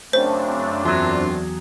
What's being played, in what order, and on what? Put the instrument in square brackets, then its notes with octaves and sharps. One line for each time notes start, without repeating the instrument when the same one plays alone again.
[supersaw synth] F#2 C4 D4 [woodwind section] C#3 A3 [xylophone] C5
[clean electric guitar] E2 F#3 [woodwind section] A3 F4